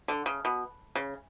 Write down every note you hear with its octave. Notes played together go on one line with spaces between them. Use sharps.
D3
C#3
B2
C#3